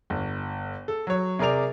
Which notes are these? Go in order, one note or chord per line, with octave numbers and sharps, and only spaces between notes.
G1
A4
F#3 C#5
C3 G#4 A#4 D5 F7